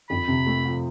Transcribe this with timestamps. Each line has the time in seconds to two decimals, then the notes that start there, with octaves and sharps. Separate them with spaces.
0.10 F2 B5
0.28 C3
0.46 A3
0.65 F3